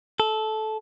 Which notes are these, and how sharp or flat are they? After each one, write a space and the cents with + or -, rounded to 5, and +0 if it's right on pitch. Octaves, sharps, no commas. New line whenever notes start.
A4 -15